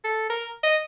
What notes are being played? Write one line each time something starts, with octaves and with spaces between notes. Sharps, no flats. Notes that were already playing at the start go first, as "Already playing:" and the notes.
A4
A#4
D#5